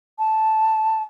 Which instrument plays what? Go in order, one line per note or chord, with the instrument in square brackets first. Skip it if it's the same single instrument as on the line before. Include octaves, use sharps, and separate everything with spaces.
[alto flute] A5